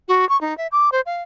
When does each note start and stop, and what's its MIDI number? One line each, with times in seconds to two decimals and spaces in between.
0.08 0.28 66
0.29 0.39 85
0.41 0.56 63
0.58 0.67 76
0.72 0.90 86
0.92 1.01 72
1.06 1.22 77